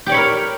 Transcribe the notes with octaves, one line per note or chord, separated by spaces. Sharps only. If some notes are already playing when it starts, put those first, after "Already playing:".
G4 A#4 C#5 D5 B5